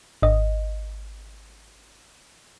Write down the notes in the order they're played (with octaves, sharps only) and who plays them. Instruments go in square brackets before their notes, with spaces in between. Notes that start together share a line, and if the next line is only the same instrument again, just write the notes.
[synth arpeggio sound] G#1 D#5